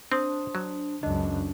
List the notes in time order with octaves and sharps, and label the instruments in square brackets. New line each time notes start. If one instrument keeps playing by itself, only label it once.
[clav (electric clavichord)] C4 [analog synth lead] D4 [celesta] C5 C6 D#6
[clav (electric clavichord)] F#3
[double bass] C#2 F#2 [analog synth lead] D4 [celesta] D#5